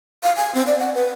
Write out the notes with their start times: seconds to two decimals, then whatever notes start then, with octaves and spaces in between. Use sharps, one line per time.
0.23 F5
0.36 G#5
0.55 C4
0.67 D5
0.79 F#5
0.95 B4